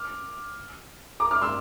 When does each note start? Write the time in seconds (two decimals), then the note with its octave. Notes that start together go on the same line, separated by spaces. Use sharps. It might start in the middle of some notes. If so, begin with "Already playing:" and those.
Already playing: D6 F6
1.20 A#5 D6
1.31 D6 F6
1.41 C6 E6